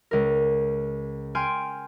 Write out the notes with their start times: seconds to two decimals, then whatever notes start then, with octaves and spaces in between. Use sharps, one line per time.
0.11 C#2 A#4
1.35 G5 G#5 C6 F6 D7